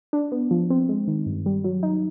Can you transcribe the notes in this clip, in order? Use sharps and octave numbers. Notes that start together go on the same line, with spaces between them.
D4
B3
F3
C4
G#3
D#3
G2
G3
F#3
D#4